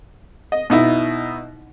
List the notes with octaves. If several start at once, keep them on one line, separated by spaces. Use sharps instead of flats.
D#5
B2 D#4 E4